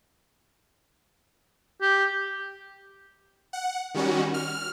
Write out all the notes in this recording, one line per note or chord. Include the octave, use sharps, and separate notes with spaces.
G4
F#5
D#3 G3 C#4 F#4
F6